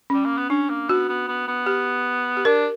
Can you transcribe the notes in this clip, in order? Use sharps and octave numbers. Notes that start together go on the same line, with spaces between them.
G3 C#4
A#3
B3
C#4 D4
A#3
B3 F#4
B3
B3
B3
G4
G4
D4 A#4